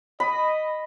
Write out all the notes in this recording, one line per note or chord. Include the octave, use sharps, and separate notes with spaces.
D#5 B5